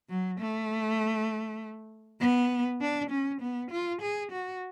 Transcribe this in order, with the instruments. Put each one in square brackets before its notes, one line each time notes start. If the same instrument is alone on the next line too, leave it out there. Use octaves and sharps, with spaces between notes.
[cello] F#3
A3
B3
D4
C#4
B3
F4
G#4
F#4